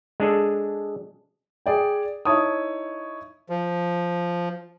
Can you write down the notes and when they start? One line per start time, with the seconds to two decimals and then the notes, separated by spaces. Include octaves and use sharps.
0.20 G#3 D4 G#4 A4
1.66 G#4 D5 G5
2.25 D#4 E4 C#5 A5 D#6
3.50 F3